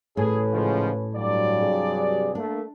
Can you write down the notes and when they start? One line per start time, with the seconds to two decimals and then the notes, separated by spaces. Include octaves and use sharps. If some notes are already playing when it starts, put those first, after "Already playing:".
0.17 A1 A2 C#4 G#4 B4
0.53 G#2 C#3 F3
1.14 G2 F#3 D5
1.59 C3 D4 G#4
2.35 A3 A#3 D4